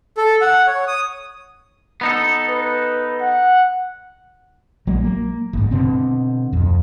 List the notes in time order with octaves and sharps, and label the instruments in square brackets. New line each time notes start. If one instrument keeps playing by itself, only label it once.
[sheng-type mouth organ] A4
F#5
C#5
D#6
[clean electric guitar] B3 D#4 A4
[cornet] B4
F#5
[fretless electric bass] A#1 F#3 G#3 A#3
A#3
G1 G#2
B2 D3 C4
D1 F2